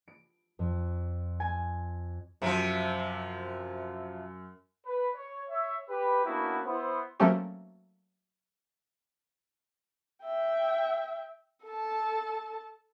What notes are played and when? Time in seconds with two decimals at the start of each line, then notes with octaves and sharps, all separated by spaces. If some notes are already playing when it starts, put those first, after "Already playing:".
0.08 D7
0.59 F2
1.40 G#5
2.42 F#2 C3 F3
4.86 B4
5.15 C#5
5.49 C#5 E5
5.90 G4 B4
6.25 A#3 B3 C#4 D4 E4 F#4
6.65 B3 E4 C5
7.20 F#3 A3 A#3 C4 C#4 G4
10.24 E5 G5
11.66 A4 A5